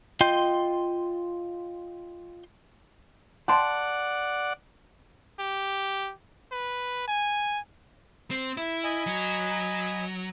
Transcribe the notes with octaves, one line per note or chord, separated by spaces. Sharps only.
F4 D#5 G5 C6 G6
D5 F#5 G5 A5 C6
G4
B4
G#5
C4
E4
D#5 G#5 B5
F#3